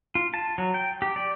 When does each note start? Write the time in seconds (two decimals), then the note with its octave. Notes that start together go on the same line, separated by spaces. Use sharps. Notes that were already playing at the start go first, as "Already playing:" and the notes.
0.15 F4
0.34 A5
0.58 F#3
0.74 G5
1.02 G4
1.16 D5